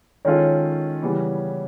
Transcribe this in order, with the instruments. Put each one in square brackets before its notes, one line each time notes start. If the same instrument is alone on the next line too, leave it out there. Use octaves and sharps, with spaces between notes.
[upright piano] D#3 G#3 C#4 F4 A4 [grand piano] C#5
[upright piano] C#3 E3 G3 B3